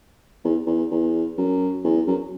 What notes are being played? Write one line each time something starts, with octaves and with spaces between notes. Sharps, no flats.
E2
E2
E2
F#2
E2
F#2